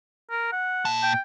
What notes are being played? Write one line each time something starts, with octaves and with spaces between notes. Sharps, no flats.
A#4
F#5
A#2 A5
G5